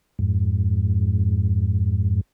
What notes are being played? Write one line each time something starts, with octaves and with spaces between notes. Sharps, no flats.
F2 G#2